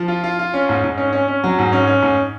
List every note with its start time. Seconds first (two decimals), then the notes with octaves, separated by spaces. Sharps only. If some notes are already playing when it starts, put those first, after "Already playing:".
Already playing: F3
0.08 F4
0.24 F4
0.39 F4
0.54 C#4
0.69 G#2
0.84 G#2
0.98 C#4
1.13 C#4
1.28 C#4
1.44 F#3
1.59 G#2
1.72 C#4
1.87 C#4
2.02 G#2